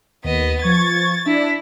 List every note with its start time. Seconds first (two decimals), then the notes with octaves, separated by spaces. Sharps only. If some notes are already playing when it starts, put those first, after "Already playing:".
0.24 D#2 B3 D#5
0.62 F3 C#6 G#6 A6
1.26 D4 E4